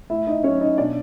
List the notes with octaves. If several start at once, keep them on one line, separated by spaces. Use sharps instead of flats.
A2 E4 E5
D#4 D#5
F#3 C#4 C#5
D#4 D#5
B2 D4 D5